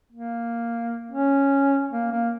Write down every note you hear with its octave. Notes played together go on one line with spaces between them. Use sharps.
A#3
C#4
A#3
A#3